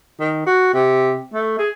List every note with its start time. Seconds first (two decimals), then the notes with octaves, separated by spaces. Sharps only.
0.20 D#3
0.46 F#4
0.74 C3
1.34 A3
1.59 G#4